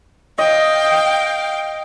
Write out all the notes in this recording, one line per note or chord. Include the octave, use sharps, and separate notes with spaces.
D#5 F5 G5